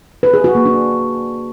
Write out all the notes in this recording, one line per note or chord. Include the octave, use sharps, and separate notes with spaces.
B4
G#4
F#4
A#3
D4